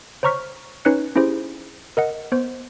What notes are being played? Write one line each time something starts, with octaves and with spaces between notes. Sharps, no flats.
C5 C#5 A#5 C#6 F6 B6
C#4 D#4 B4 C#5 F#6 C#7
C#4 E4 G4 G#4 C5
A#4 D#5 F#5
B3 C5